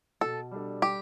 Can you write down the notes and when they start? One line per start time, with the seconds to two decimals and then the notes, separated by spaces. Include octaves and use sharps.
0.21 B2 A4
0.51 G3 D4 A4
0.82 G3 G4